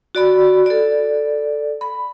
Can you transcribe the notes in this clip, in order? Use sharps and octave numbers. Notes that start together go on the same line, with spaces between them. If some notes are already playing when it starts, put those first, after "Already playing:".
F#4 D5 B5
A4 D5
B5